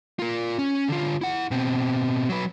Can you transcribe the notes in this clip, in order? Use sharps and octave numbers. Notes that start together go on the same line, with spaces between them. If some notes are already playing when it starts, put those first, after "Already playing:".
F4 A#4
C#4
D3 F4
E4 F#5
B2 C4
F#3 B4